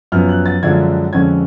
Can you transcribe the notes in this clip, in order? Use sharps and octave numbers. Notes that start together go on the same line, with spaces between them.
F#2 F3 B3 F6
F#6
A6
F#2 D3 F3 G#3 D4 G#6
F2 D3 G#3 C#4 G#6